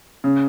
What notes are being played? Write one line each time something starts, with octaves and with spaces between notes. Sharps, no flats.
C#3